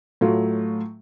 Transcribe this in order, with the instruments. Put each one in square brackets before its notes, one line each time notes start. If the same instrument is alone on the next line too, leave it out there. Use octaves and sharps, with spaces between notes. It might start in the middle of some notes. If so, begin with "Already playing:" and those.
[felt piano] A2 F#3 A3 F4